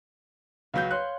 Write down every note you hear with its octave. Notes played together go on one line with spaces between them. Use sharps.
C#2 F#3 B4 F5 G6
C#5 C6 F#6